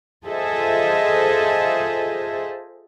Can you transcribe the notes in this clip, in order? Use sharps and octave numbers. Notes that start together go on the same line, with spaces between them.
F4 G#4 A4 C5 D#5 E5